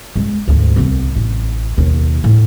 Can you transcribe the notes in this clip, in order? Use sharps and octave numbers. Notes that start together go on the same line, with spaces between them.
E2 G#3
D2 G#2
C2 B3
A1
D#2 B2
A2